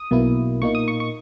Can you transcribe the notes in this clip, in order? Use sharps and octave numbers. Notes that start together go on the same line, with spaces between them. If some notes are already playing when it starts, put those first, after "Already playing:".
Already playing: D#6
B1 B2 A#3 E4
A#2 A#3 D#4 C#6
D#6
C#6
C#6